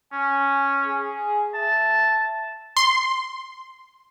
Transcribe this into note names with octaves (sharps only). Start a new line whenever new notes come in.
C#4 G#5
G#4
E5 A5
C6